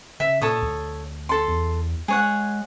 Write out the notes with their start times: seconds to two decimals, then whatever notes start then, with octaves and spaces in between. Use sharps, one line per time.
0.20 C#3 E5
0.41 A#2 A4 C#5 D#6
0.62 D2
1.29 A4 C6
1.48 E2
2.08 G#3 G#4 C#5 F#5